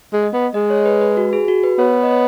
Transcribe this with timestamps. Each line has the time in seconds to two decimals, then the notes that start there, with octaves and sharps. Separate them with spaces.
0.13 G#3
0.23 D#5
0.33 B3
0.54 G#3 D#5
0.70 C#5
0.86 B4
1.01 B4
1.17 F#4
1.33 G#4
1.48 F#4
1.63 B4
1.79 B3 C#5
2.03 D#5
2.11 C#5